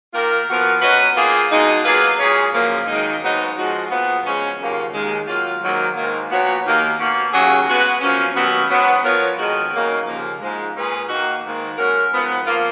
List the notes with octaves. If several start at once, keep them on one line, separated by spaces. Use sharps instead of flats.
D#3 A#3 F4 A#4
F3 B3 F#4 A#4
F#3 C#4 F#4 B4 D#5
D#3 A#3 F4 G#4
B2 G#3 D#4
F#3 A#3 F4 G#4 B4
A#2 G#3 C#4 G#4 C#5
F#2 C#3 F3 A#3
F#2 D#3 G#3 D#4
G#2 F#3 B3 D#4 F#4
F3 G#3 D#4 F#4
A#2 F3 B3
C#3 F3 G#3 C#4
D#2 C#3 F#3 A#3 F4
D#2 D#3 G#3
D#3 F#3 A#3 F4
G#2 D#3 F#3 A#3
G#2 D#3 A#3
A#2 F3 B3 F#4 C#5
D#2 D#3 A#3
B2 A#3 C#4 F#4
D#2 C#3 F#3 C#4 G#4
G#3 B3 F#4 B4
F#2 F3 A#3 C#4
D#2 D#3 F#3 B3 F#4
G#2 F#3 B3
F3 B3 F4 A#4 C#5
F2 D#3 G#3 D#4 F#4
C#3 F#3 A#3 D#4
D#2 C#3 F3 A#3
G#2 F3 G#3
A#2 G#3 C#4 G#4 B4
D#3 A#3 D#4 F#4
G#2 D#3 A#3
G#3 C#4 F#4 A#4
G#2 F3 B3
F3 A#3 F4 A#4 F5